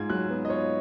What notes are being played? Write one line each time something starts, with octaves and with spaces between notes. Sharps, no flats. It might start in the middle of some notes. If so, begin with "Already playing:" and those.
Already playing: G#2 F4 G#6
F#3 F#6
B3
D#5
F4 C#5